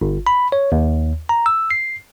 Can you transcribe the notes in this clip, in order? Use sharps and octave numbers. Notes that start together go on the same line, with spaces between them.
G1
B5
C#5
D#2
A#5
E6
C7